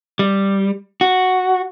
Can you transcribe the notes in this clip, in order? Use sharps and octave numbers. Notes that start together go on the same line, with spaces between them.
G3
F#4